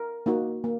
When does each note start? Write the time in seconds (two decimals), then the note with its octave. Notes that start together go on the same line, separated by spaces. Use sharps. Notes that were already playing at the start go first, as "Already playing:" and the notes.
Already playing: A#4
0.26 A#3 D#4 F#4
0.64 A#3